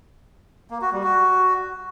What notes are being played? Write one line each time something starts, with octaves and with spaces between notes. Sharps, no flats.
A#3
F#4
G3
F#4